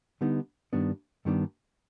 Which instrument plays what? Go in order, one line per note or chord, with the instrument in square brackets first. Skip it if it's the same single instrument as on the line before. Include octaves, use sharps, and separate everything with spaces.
[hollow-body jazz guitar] D3 G3 B3 D#4
G2 D#3 G3 B3 D4
G2 D#3 G3 B3 D4